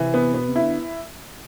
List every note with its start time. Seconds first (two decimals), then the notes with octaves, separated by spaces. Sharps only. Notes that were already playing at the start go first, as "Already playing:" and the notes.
Already playing: C3 E3
0.14 B3
0.34 B2 B3
0.48 C3
0.56 E4
0.62 D3